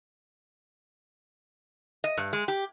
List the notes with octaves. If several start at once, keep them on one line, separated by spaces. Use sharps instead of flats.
D#5
G2
G#3
G4